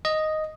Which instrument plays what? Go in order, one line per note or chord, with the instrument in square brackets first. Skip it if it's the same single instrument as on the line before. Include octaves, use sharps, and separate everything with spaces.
[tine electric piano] D#5